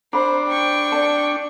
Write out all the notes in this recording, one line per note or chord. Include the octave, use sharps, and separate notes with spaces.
D4 C5 A#5 B5
G5 C#6
D5 A5